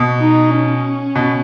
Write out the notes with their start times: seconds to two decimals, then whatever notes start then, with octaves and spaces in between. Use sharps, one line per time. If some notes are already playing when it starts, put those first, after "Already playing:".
Already playing: B2
0.20 D#4
0.51 C#4
1.15 B2